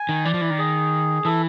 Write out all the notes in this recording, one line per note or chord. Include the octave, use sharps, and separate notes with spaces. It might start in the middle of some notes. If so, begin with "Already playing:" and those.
Already playing: G#5
D#3
E3 D5
F3
E3
D#3
G#4
E3 A4